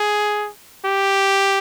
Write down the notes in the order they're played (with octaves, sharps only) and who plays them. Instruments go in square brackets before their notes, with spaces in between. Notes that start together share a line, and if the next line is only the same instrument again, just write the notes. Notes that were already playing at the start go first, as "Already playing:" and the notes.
Already playing: [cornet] G#4
G4